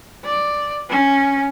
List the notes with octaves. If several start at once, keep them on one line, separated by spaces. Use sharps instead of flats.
D5
C#4